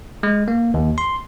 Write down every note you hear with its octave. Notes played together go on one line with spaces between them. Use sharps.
G#3
A#3
D#2
C6